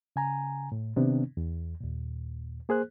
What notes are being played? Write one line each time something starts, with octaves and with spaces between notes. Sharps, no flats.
C#3 G#5 A#5
A2
C3 D#3 B3 C4 D4
E2
D#2 A#2
A#3 G#4 C5 F#6